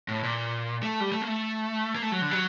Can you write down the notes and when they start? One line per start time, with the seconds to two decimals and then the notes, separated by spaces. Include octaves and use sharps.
0.08 A2
0.23 A#2
0.83 A3
1.00 G3
1.12 A3
1.22 A#3
1.28 A3
1.95 A#3
2.02 A3
2.12 F#3
2.21 D3
2.31 F#3